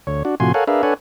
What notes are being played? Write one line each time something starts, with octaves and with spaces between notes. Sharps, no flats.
D2 C#5
D4 F#4
A2 C3 F3 F#4 G#5 C6
A4 A#4 C#5 F5 F#5 G#5
D4 G#4 A#4 B4 E5 F5
D4 A4 B4 C#5 F#5 G#5